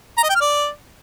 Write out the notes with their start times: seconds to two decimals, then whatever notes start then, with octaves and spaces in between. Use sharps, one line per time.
0.18 A#5
0.24 D#5
0.29 G5
0.35 F6
0.41 D5